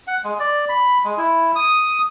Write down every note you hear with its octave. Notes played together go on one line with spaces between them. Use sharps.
F#5
G#3
D5
B5
G#3
E4
D#6